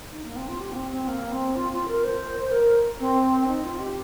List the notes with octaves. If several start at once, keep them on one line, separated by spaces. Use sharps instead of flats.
D#4
A#3
C4
F4
G4
A#3
C4
C4
A#3
C4
F4
F4
A#4
C5
A#4
C4
D#4
F4
G4